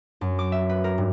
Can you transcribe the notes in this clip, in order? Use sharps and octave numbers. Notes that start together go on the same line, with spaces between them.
F#2
D6
E5
B4
A#4
G2